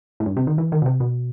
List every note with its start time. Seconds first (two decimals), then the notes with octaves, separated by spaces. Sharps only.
0.20 A2
0.26 G2
0.37 C3
0.47 D#3
0.58 E3
0.72 D#3
0.82 B2
0.86 C3
1.00 B2